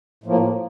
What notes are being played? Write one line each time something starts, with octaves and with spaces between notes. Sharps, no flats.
A2 F3 A#3